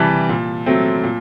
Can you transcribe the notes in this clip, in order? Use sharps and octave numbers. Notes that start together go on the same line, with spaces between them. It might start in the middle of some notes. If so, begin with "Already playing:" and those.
Already playing: C3 E3 G3 A5
A#2
F#3 A3 C4
A#2